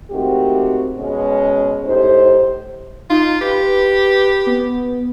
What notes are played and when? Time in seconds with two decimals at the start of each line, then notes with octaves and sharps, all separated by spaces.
0.11 D#3 G#3 A3 C4 F#4 G4
0.98 B2 G#3 C#4
1.84 A2 D#4 G4 C5
3.10 D#4 F4
3.41 G4 B4
4.46 B3